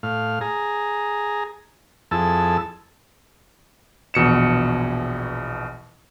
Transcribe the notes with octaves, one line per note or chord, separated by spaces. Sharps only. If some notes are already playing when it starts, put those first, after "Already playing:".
A2 F5
G#4 A#5
F2 E4 G#4 A4 A5 E6
A#1 E2 B2 C#7 E7